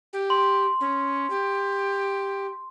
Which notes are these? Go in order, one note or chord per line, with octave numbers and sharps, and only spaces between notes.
G4
C6
C#4
G4